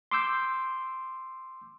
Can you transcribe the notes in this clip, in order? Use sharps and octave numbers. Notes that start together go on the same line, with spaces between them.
C6 D6 E6 G6